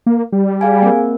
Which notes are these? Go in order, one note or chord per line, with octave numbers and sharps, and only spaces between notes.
A#3
G3
G#4 F5 G#5
A#3 C4 A#4